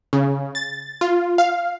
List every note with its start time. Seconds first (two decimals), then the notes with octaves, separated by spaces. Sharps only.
0.13 C#3
0.55 A6
1.01 F4
1.38 F5